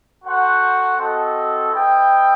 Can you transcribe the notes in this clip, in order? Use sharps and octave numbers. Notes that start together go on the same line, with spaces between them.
F#4 A4 C5 F#5
C4 F#4 A4 D#5
E4 B4 D#5 G5